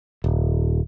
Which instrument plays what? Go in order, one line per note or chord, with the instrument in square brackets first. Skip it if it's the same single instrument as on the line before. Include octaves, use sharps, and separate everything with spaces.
[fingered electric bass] D#1